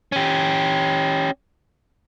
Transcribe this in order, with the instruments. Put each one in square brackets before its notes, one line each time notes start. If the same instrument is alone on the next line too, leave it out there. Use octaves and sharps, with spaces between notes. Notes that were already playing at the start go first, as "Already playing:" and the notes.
[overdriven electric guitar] C#4 G4